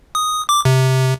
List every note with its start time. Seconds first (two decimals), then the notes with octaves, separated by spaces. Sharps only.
0.15 D#6
0.49 D6
0.65 C3